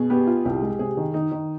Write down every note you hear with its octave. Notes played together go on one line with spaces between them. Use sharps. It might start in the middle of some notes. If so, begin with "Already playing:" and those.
Already playing: B2 G#4
B3 G4
F4
C2 G4
G#3
C3 G#4
D#3
D#3 D#4
D#3